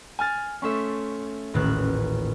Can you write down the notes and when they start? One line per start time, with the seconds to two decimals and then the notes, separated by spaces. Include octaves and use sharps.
0.19 G#5 F6 A6
0.62 A3 C#4 E5 C6 C#6
1.54 D#1 A1 F#6